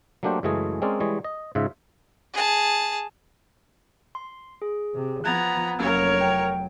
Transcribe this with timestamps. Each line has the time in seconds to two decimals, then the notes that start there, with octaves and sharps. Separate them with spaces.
0.23 F#3 A3 A#3 D4 G4 C5
0.43 F#2 C#3 E3 G#3 A3 G#4
0.82 G#3 C4 C#4 G#4 A#4 D5
1.00 E3 G3 G#3 C#5 D#5
1.24 D#5
1.55 G#2 C#3 F4 E5
2.34 G#4 A5
4.15 C6
4.62 G#4
4.95 C3
5.24 F3 B3 A#5 F#6 G#6 A6
5.79 F1 F#3 A#3 C#4 A#4 C#5 F6
6.21 G5